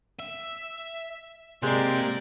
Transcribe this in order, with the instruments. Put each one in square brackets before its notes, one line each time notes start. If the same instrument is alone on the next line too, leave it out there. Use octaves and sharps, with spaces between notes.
[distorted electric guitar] E5
[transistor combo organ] C3 G4 [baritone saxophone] G#3 [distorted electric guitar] A#3 [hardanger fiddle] A#4 D5